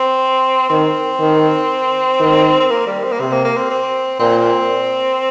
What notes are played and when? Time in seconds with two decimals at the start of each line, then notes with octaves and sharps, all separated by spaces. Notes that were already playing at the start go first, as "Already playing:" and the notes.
Already playing: C4
0.69 D#3 C4
1.20 D#3
2.20 D#3
2.60 C4
2.70 A#3
2.86 G3
3.04 C4
3.12 A#3
3.20 C3 C4
3.32 A#3
3.44 A#3
3.57 C4
3.70 C4
4.20 A#2 C4